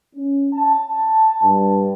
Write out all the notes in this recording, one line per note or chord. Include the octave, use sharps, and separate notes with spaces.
C#4
A5
G2